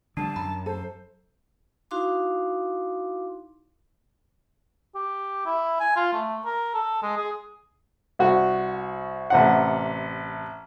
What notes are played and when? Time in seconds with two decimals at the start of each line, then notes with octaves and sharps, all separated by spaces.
0.17 D3 G3 D4 A5
0.36 F#2 A#5 B5
0.66 A4 C5
1.91 D#4 E4 F#4 F5 C6 D6
4.95 G4
5.46 E4
5.80 G#5
5.96 F4
6.13 A3
6.45 A#4
6.74 A4
7.02 G#3
7.17 G#4
8.19 C2 F#4
9.30 A1 C3 F#5